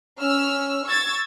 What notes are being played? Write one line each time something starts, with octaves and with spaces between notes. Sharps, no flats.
C#4 E6 F6
C#6 E6 G#6 A6